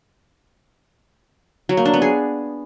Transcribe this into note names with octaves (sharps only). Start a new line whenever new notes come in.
F#3
A#3
D4
B3
G#4